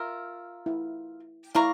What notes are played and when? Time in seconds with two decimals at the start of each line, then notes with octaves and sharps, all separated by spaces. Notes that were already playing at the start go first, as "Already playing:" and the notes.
Already playing: F4 A#4 E5
0.66 E4
1.55 E4 D5 F5 A#5 C#6